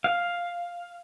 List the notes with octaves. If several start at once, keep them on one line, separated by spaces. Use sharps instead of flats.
F5